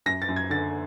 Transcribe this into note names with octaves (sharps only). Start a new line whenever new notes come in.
F#2 A#6
A6
F#2
G#6
D3 A6